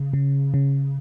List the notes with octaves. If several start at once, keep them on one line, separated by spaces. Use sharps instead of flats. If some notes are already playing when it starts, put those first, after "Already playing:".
Already playing: C#3
C#3
C#3